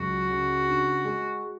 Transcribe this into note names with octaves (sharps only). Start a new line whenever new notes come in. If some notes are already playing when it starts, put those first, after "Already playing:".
Already playing: C#2 F#3 F#4
C#3
D4
G#3